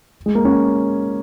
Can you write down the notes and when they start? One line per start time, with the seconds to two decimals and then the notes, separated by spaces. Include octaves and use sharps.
0.26 G#3
0.35 A#3
0.45 C#4